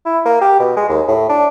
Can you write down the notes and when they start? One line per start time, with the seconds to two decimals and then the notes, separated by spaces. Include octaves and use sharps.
0.06 E4
0.25 A#3
0.41 G4
0.60 B2
0.77 G#3
0.89 D#2
1.08 A2
1.29 D4